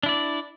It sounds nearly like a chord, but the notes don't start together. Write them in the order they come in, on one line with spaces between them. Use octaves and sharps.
D4 E4 D5